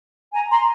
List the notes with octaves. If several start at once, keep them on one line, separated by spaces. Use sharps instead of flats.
G#5 A#5
A#5 C6